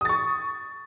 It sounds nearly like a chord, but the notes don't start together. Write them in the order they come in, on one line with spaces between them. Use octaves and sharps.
D#6 A6 C#6